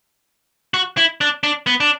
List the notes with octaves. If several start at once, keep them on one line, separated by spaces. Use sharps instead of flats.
F#4
E4
D4
D4
B3
D4